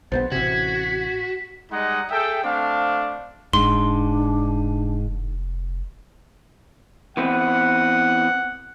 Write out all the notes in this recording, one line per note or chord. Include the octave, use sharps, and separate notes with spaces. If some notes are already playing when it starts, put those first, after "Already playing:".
A#1 D#3 B3 C5 A6
A1 C3 F#4 G#6 B6
G3 G#3 D#4 D#5 F#5 A#5
G#4 A4 E5 G5
A3 C4 D4 F5
F1 G#2 D4 C6
E3 B3 C4 F#5